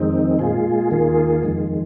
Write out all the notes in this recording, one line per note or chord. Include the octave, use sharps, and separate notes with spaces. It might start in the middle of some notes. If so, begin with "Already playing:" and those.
Already playing: F2 D#3 G#3 C4 D#4
A#2 G#3 F4 G#4
D#2 D#3 A#3 F4 G#4
F2 D#3 G#3